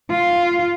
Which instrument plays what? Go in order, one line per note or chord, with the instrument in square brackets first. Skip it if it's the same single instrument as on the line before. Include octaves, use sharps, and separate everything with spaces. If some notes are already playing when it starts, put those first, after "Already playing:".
[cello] F4